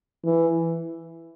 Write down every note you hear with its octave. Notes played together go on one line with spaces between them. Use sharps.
E3